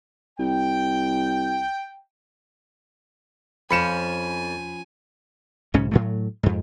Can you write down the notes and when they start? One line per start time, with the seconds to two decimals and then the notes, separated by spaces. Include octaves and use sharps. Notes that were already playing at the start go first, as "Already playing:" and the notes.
0.39 C2 G5
3.71 F2 F3 C#4 G#5 B5 C#7 E7
5.74 B1 G#2 C#3 C#4
5.92 A2 F#3 A3
6.43 F2 G#2